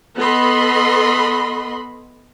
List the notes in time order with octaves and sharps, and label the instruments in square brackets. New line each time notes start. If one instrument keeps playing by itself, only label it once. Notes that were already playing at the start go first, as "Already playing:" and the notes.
[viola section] B3 A4 D#5 B5 C6